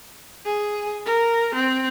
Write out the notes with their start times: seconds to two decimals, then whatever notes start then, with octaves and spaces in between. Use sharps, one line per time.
0.45 G#4
1.06 A#4
1.55 C4